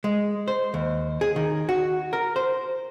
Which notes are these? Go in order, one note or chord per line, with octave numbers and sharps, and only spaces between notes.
G#3
C5
D#2
G#4
D#3
F#4
A#4
C5